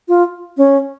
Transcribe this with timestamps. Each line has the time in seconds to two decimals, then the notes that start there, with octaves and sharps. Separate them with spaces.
0.08 F4
0.57 C#4